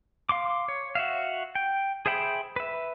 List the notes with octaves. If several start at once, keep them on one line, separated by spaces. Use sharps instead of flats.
F5 C6 D6
C#5
F#4 E5 F5
G5
G#4 C5 E5 G5 B5
B4 E5